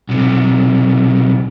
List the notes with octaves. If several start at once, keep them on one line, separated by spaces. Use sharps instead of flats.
B1 C3